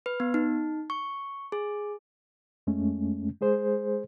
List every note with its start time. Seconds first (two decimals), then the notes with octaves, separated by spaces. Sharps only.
0.06 B4
0.20 B3
0.34 D#4
0.90 C#6
1.52 G#4
2.67 F2 G#3 A3 C#4
3.41 G#3 G#4 C5